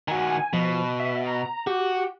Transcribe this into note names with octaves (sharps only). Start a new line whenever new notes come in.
D#3 F#4 G#5
B2 F3
E5
A#5
F#4 G4